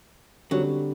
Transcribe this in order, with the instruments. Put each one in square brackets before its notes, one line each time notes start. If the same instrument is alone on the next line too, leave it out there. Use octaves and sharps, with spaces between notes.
[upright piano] D3 G3 C4 [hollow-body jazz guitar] F#3